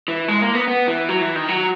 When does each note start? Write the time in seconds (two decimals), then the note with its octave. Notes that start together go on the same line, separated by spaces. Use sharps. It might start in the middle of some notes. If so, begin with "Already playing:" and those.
0.08 E3
0.28 G#3
0.42 A#3
0.55 B3
0.68 B3
0.88 E3
1.09 F#3
1.21 E3
1.35 D#3
1.48 F#3